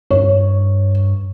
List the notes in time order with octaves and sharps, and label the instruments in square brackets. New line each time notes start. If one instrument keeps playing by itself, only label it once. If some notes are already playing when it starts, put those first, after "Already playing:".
[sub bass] G2 [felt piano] C#5